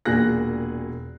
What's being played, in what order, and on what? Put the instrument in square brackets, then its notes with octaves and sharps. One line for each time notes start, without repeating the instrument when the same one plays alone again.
[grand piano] E1 A#2 A#3 G#4 F#6 A#6